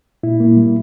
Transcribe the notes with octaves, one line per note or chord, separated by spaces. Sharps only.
A#2 E4
A#3
G3